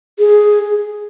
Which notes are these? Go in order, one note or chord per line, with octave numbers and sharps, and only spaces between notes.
G#4